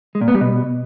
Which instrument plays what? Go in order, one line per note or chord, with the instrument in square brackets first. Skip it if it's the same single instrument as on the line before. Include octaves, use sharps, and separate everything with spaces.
[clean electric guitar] G#3
A#2
B3
G3
B2